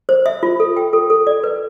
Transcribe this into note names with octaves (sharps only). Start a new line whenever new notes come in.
C5
E5
F4
A4
G5
A4
A4
D5
B4